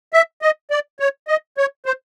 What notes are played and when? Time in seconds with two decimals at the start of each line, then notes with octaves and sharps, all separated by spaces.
0.13 E5
0.42 D#5
0.71 D5
1.00 C#5
1.28 D#5
1.57 C#5
1.86 C5